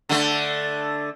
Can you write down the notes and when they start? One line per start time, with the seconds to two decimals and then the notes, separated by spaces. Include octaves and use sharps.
0.09 D3 A3